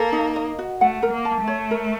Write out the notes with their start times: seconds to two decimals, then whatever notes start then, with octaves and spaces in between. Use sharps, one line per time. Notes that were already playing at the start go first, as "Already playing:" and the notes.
Already playing: A#3 A4
0.12 D#4
0.36 D#5
0.59 F#4
0.81 A3 F#5
1.03 A#4
1.11 A#3
1.25 A5
1.40 A3
1.47 C#5
1.71 A#4